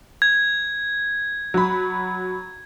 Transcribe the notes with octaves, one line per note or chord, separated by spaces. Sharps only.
G#6
F#3 B5